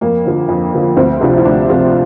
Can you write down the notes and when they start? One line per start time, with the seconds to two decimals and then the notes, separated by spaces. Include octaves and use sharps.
0.01 F2 A#3
0.25 D3 F3
0.49 F2
0.73 D3 F3
0.97 D2 C4
1.21 C3 F3 D4
1.38 E4
1.45 D2 D4
1.69 C3 F3 F4